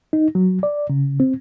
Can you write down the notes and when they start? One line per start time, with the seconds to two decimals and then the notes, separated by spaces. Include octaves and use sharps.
0.13 D#4
0.35 F#3
0.63 D5
0.90 C#3
1.20 C4